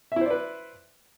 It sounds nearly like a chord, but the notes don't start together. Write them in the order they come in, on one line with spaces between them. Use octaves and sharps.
E5 E4 C5 D5 B4